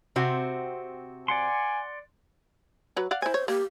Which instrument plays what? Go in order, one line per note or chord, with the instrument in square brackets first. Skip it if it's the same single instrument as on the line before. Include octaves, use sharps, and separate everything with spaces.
[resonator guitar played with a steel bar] C3 C4 F#4
[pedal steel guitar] D5 F#5 C6 [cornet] G#5
[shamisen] F#3 B4
D5 F5 F#5
[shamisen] E4 G#5 [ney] C5
[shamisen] C#5
[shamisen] A#3 [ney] G4